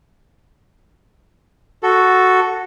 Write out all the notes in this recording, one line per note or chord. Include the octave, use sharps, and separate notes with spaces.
F#4 A4